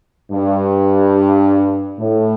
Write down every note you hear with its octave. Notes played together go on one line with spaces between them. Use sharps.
G2
A2